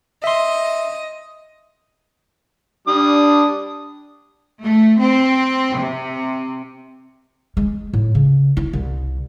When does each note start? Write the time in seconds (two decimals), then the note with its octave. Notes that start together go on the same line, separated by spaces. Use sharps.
0.24 D#5 E5 C6
2.88 G3 D4 D#6
4.64 A3
5.01 C4
5.78 C3
7.57 G#3
7.93 A2
8.15 C#3
8.57 E4
8.73 C2